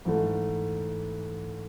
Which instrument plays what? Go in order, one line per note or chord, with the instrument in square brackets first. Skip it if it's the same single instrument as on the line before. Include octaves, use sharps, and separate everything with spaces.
[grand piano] G#2 E3 A3